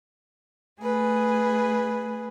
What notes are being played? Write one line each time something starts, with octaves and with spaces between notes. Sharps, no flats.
A3 G#4 B4